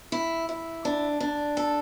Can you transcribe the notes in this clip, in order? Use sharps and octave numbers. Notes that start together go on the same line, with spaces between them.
E4
E4
D4
D4
A4